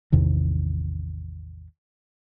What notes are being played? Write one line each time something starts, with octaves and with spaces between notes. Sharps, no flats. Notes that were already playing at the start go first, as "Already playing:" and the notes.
A1 E2 C3 D#3